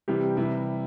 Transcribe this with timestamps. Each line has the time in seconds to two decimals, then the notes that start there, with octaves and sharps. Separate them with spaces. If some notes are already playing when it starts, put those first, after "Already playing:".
0.08 C3 E3 G3 G4
0.37 C3 E3 G3 E4